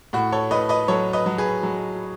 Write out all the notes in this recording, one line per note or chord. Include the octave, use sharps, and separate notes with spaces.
A2 F#4
A4 C#5
A2 B4 D#5
B4 D#5
F#3 A4 C#5
B4 D#5
F#3
G#4 B4
F#3